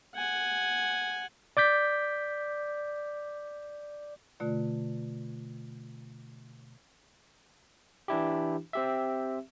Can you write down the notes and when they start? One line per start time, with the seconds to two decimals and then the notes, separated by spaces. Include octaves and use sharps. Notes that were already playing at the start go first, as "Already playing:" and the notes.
0.15 F#5 G#5
1.57 D5 D6 G6 B6
4.40 B2 D3 A3 F4 D5
8.08 E3 D4 E4 G4
8.73 C4 G4 E5